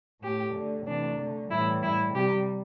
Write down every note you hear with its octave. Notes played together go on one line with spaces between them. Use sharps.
A2 A3 G4
D3 A3
C3 E3 A3 D4
D3 A3
A2 E3 G3 E4
A2 G3 E4
C3 G3 G4